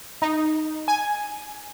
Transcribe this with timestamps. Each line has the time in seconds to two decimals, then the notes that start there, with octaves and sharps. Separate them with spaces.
0.22 D#4
0.88 G#5